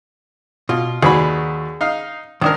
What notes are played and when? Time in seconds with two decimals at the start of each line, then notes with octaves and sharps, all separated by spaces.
0.69 B2 F4
1.03 D#2 F#3 G#4 B4 D5 B5
1.81 D#4 F5
2.41 G#1 D#3 D4 A#4